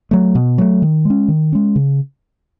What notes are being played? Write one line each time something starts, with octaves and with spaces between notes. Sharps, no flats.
F#3 A3
B2
F#3 A3
D#3
G#3 C#4
D#3
G#3 C#4
C#3